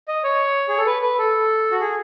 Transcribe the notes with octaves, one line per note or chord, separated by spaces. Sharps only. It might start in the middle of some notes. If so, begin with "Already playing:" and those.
D#5
C#5
G#4
A4
B4
B4
A4
F#4
G#4